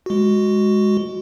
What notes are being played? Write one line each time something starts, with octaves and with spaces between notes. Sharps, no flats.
G#3 F#4